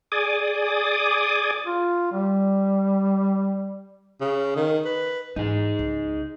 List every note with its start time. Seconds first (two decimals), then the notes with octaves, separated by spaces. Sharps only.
0.12 G#4 D5 G#5 D6 D#6
1.66 F4
2.12 G3
4.21 C#3
4.56 D#3
4.85 B4
5.36 G#2 E3 D#4 G#4
5.79 C#2